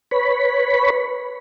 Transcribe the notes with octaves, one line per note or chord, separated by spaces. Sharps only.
B4 C#5 B5